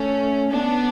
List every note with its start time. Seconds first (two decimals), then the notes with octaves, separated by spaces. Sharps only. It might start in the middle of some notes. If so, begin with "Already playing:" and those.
Already playing: A3 C#4
0.50 B3 D4